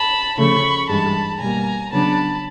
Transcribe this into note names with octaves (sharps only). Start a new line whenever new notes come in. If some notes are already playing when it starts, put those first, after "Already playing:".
Already playing: A5 B5
C#3 F3 A3 B5 C#6
G2 E3 G#3 A5 B5
B2 G3 A#3 G#5 A#5
C#3 F#3 B3 D4 A5 B5